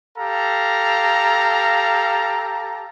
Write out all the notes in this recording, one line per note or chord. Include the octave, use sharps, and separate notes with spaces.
G4 A4 F5 A#5